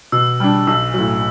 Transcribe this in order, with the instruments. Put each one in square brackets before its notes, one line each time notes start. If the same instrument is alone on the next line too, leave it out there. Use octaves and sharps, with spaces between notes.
[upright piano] B2 [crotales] E6
[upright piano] G3 D4
[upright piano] B1 [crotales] E6
[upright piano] A2 F#3